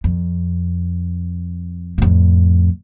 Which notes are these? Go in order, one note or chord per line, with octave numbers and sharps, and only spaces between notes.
F2
F2 A2